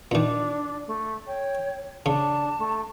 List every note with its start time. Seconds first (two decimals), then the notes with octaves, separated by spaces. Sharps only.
0.11 A#2 D#3 D4
0.87 A3
1.27 C#5 G5
2.06 C#3 D4 A5
2.58 A3